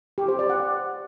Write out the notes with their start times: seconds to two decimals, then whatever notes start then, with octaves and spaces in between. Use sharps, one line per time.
0.18 G4
0.28 C5
0.39 D5
0.50 F#5